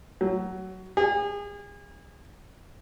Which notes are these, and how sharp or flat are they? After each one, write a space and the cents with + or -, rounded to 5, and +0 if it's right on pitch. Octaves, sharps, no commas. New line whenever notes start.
F#3 +15
G#4 -35